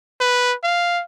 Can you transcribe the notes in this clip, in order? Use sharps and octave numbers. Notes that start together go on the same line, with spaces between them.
B4
F5